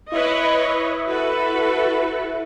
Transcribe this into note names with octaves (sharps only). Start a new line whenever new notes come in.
E4 B4 C#5 D#5
F#4 A4 B4